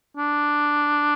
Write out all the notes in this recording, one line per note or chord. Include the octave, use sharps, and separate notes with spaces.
D4